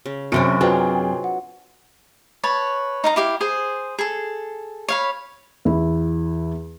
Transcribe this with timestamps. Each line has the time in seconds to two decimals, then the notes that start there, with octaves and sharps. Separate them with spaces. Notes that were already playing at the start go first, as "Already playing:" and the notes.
0.06 C#3
0.32 F#1 F#2 C3 C#4 D4 F#4 C#7 D7
0.61 F#3 C4 F4 G#4 B4 D#5 G5 A#5
1.24 F#5
2.43 B4 C#5 A5
3.04 D#4 F5 A#5
3.16 E4 G4 F5
3.41 G#4 C5
3.99 G#4 A4
4.89 C#5 F5 B5
5.65 E2 E4